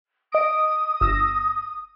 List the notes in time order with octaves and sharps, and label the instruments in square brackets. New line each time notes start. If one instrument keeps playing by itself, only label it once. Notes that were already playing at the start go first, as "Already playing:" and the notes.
[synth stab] D#5 D7 [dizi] D#6
[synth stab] G1 E6 A#6